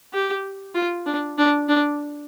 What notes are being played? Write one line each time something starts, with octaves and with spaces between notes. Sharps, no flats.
G4
F4
D4
D4
D4